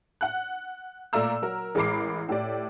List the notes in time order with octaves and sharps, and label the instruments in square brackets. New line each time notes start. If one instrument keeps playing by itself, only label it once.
[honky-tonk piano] F#5 F#6
A#2 A3 D5 F5 A#5 E6
F#3 A#4
A1 G#3 A#4 B5 D6 C7
A2 G4 D5